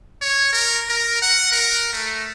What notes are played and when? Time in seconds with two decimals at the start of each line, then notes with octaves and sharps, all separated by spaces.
0.21 C#5
0.53 A#4
0.89 A#4
1.22 F#5
1.52 A#4
1.93 A3